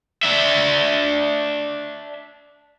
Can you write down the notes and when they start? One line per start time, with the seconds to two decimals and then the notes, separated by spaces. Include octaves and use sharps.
0.23 D4 E5